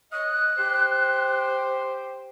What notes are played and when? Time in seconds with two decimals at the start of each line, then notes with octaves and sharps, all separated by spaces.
0.12 C#5 D#5 F#6
0.58 G4 C5